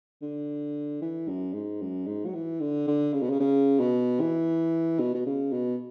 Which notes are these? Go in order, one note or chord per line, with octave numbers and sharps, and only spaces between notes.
D3
E3
F#2
G#2
F#2
G#2
F#3
E3
D3
D3
C#3
B2
C#3
C#3
B2
E3
B2
B2
C#3
B2